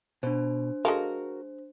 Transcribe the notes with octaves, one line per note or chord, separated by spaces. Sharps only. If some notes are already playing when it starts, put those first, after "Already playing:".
B2 D4 C5
G#3 F#4 A4 A#4 F5